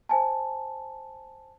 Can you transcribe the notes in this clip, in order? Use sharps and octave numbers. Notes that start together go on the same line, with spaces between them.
C5 G#5 A5